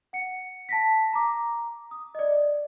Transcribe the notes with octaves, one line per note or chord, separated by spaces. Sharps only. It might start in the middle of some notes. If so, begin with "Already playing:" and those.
F#5 C#7
A5 A#6 B6
A#5 D6
D#6
D5 D#5